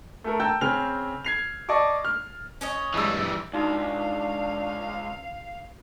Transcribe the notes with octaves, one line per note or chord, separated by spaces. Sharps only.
A3 A4 A#4
G5 A5 A#5 E6 G6
C#3 C4 G#4 F6 F7
G#6 C7 F7
D5 D#5 A5 C#6 D6
F6
C#4 C#5 D#5
G2 E3 G3 G#3 E6
A#1
C#2 D4 D#4 F#4 F5